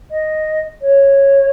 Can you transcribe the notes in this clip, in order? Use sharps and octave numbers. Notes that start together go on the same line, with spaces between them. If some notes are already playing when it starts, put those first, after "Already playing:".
D#5
C#5